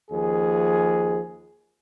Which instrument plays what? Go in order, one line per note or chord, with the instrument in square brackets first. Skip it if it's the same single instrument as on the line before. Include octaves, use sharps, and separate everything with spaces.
[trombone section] D#2 F3 G#4